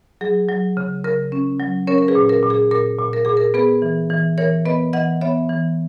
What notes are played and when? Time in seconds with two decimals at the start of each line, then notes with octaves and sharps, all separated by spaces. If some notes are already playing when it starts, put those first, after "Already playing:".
0.21 F#3 G#4
0.49 F#3
0.77 C#3
1.04 C#3 A#4
1.32 C#4
1.60 F#3
1.87 C#4 A#4 C#5
1.98 A#4
2.08 G#4 B4
2.15 A#2
2.29 A#4
2.43 A#2
2.50 G#4
2.71 A#2 A#4
2.99 A#2
3.13 A#4
3.25 A#2 G#4
3.37 A#4
3.54 B3 G#4 B4
3.82 E3
4.10 E3
4.38 E3 A#4 C#5
4.65 B3 B4 D#5
4.93 E3 D#5 F#5
5.21 B3 C#5 E5
5.49 E3